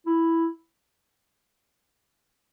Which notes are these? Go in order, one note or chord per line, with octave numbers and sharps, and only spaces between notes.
E4